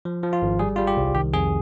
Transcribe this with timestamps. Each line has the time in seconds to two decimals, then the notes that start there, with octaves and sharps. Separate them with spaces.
0.05 F3
0.23 F3
0.33 F4
0.42 G#1
0.59 G3 G#4
0.76 G3 F4
0.87 G4
0.97 C2
1.15 D#3 G4
1.34 F2 G#4